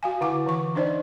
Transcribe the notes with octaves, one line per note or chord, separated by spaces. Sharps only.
F#4 F5 G#5
D3 E4 F#5 D6
D3 E3 C#6
D4 D#4 C5 D5 D#5